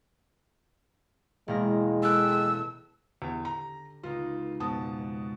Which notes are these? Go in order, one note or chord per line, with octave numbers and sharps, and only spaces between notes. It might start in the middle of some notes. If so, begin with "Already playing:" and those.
E1 G#3 A#3 A#6
A4 G5 E6 F#6
E2 D3 G4
A#5
C#2 D#4 F4
F2 B2 G#3 A5 D#6